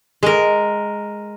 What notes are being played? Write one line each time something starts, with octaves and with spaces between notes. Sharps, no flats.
G#3 A#4